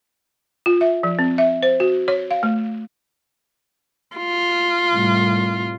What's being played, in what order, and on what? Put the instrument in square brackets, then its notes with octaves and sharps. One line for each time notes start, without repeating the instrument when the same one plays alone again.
[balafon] F4
E5
F3
C4
E5
C5
F#4
C#5
F5
A3
[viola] F4
[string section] C2 A2